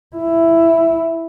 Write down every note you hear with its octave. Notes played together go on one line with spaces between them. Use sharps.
E4